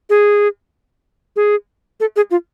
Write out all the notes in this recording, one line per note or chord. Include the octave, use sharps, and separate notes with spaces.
G#4
G#4
A4
G#4
F4